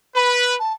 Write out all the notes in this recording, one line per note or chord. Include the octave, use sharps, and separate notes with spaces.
B4 B5
A5